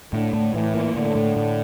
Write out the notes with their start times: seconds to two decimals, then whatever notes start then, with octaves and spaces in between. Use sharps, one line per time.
0.12 A2 D3
0.33 A2
0.54 A2 E3
0.74 A#3
0.95 A2 D3
1.15 A2
1.36 A2